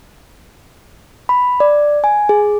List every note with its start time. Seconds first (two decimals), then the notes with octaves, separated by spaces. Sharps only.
1.29 B5
1.60 D5
2.04 G#5
2.29 G#4